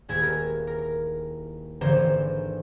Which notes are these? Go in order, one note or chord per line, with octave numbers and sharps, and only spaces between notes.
D#1 G#3 E4 G#4 G#6
A#4
A#4
G#1 D3 E3 C5 A#5 E7